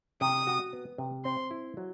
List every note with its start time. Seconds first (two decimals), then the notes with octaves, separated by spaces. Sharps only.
0.21 C3 D#6
0.47 F#4
0.73 B3
0.98 C3
1.25 C4 C6
1.51 E4
1.77 F#3